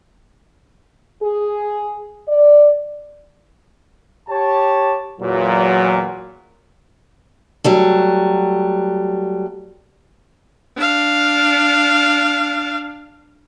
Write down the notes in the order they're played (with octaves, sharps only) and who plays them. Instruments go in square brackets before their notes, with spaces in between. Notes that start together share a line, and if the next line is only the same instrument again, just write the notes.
[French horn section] G#4
D5
[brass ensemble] G4 C#5 A5
E2 A#2 F#3
[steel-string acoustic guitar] F#3 G3 A3
[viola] D4 F5